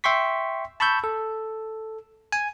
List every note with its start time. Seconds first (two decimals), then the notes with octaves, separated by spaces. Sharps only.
0.04 E5 G5 C6 C#6 B6
0.80 A5 B5 C#6 E6 G6
1.04 A4
2.32 G#5